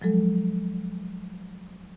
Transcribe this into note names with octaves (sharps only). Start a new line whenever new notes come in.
F3 F#3 G#3 A4